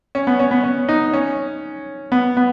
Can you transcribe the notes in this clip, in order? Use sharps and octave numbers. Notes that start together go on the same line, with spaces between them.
C#4
B3
C#4
B3
C#4
D#4
C#4
B3
B3